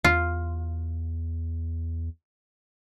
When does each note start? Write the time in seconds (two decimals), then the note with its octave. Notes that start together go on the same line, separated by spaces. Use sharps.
0.04 E2 F4